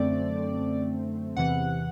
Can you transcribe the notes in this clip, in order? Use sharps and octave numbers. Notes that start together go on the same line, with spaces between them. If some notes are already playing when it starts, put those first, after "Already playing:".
Already playing: F#2 D3 A3 C4 D5
E2 C3 E3 F#5